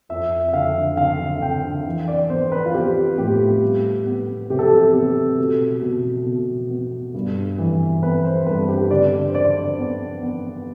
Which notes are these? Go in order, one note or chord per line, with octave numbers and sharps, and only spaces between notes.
F2 E5
E5
D3 F5
D3 F5
D3 G5
E3
D5
B3 C5
B4
F4
B3 G4
A2 G4
G3
B3
C3 G4
A4
G4
B3
B2
B2
B2
B3
G2
E3
B3 B4
C5
G2 B4
G4
D3 D5
C5
D3 D5
B3
B3